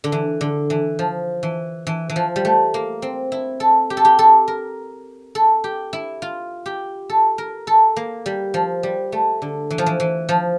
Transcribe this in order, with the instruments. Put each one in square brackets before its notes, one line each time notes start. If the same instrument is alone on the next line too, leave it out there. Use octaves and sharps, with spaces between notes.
[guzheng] D3
E3
D3
E3
F3
E3
E3
E3
F3
G3
A3
A#3
C4
E4
A4
G4
A4
G4
A4
A#4
A4
G4
E4
F4
G4
A4
A#4
A4
A#3
G3
F3
G3
A3
D3
E3
F3
E3
E3
F3